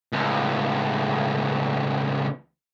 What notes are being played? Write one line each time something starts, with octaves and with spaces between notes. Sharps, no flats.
C#2 A2